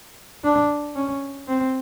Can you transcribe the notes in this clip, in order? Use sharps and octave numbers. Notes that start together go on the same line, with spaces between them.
D4
C#4
C4